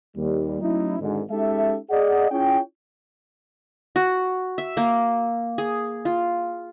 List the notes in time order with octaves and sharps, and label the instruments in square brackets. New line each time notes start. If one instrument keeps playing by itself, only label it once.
[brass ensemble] D#2 G3
F#3 A3 C#4 D#4 E4
G#1 G#2 D3
G#3 C#4 D#4 G4 A4 E5
G#4 D5 D#5 F#5
C#4 E4 F4 G#4 C#5 G5
[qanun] F#4
E5
A#3
G#4
F4